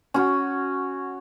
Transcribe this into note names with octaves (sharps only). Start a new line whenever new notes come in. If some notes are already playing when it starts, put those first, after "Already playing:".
C#4 F#4